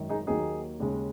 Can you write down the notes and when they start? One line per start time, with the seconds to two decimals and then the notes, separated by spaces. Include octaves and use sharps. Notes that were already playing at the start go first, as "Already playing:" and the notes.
Already playing: G#1 F#2 D#3
0.09 D#4 G#4
0.27 D#2 D#3 F#3 A#3 D#4 G#4
0.80 D#2 C#3 G#3